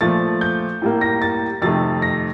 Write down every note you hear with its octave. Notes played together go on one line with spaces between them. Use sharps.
A#2 F3 A3 A6
G6
A2 G3 A#3
A#6
A6
F2 C3 D#3 A3 A6
A#6